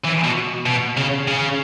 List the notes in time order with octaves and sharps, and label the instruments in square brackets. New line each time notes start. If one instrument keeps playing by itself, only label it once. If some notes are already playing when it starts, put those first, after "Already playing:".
[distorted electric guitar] E3
B2
B2
C#3
C#3